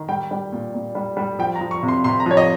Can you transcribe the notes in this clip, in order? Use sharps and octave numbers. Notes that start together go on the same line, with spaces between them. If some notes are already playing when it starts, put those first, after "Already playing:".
Already playing: D#3
G3 G5
G3
A#2
A#2
G3
G3
F3 G5
A#5
F3
C#6
C3
C6
C3 C6
A#5
F3 C#5
D#5